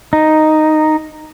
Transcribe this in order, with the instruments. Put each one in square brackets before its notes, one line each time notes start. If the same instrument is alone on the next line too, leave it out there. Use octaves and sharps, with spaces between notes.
[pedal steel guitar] D#4